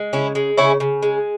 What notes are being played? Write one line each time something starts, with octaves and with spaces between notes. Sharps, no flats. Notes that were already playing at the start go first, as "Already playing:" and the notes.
Already playing: G#3
C#3 C#4 E4
G#3
C#3 C#4 E4
C#3
G#3